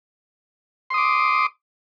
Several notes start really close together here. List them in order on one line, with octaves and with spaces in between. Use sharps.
C6 D#6 D6